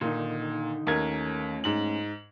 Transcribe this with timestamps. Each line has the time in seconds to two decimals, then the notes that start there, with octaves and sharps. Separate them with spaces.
0.01 A#2 D3 D#3 D#4
0.87 D#2 A3 C#4 F4 A#4 G#6
1.64 G#2 F#7